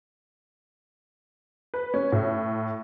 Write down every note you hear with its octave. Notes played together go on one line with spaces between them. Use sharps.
B4
C#4
A2